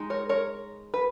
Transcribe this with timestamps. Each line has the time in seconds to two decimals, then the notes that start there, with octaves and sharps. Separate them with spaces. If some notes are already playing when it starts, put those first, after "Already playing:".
Already playing: G#3 D#4
0.10 A#4 C#5
0.29 A#4 C#5
0.94 B4